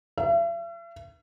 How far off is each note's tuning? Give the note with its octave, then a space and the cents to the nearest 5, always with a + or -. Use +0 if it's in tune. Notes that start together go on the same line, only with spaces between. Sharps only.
E5 +45